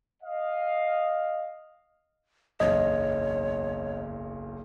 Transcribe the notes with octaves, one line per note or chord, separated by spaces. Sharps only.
D#5 F5
F#1 B1 E2 C#5 D#5